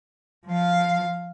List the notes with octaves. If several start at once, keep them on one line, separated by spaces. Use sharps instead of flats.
F3 F5